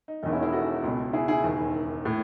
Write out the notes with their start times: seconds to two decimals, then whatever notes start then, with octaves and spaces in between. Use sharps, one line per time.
0.08 D#4
0.23 E1 D#4
0.25 E2 D#3
0.33 C#4 E4
0.43 E4 G#4
0.52 F#4 A4
0.84 C#2 B2
1.13 E4 G#4
1.28 E4 G#4
1.43 E1 D#2 D#3
2.05 A2